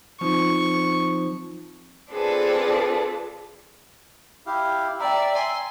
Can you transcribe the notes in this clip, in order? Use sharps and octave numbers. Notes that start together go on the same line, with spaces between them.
F3 C4 D#4 F4 C#6
C4 D4 F4 G#4 A4 B4
E4 G4 F5
D5 E5 G5 A#5
G#5 C6